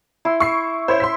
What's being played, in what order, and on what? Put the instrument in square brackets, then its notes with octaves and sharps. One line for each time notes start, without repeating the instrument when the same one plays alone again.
[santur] E4 C6
[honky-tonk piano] C#6 C7
[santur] E4 [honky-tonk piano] C5 C#5 E5
[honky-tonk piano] C6 B6